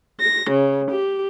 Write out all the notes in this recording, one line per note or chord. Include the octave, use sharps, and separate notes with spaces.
A#6
C#3
G4